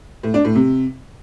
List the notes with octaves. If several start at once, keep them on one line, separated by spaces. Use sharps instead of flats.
A2
D4
A2
C3